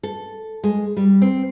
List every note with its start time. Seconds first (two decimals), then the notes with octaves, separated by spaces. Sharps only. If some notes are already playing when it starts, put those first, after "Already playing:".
0.03 A4
0.63 G#3
0.96 G3
1.22 C4